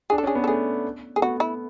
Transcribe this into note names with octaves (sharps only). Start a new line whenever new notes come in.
D4 G#4
A4
C#4 G#4
B3
A4
A3 G#4
A3 G#4
B3 F#4
E4